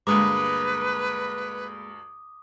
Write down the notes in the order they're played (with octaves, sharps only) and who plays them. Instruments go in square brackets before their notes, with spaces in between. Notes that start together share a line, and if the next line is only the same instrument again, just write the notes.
[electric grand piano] D2 G2 A#5 [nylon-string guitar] G#3 A#3 [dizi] B4 [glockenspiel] D6 D#6